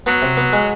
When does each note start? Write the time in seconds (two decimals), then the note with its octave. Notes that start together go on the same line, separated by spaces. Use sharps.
0.06 F#3 B3
0.22 C3
0.37 B3
0.53 G#3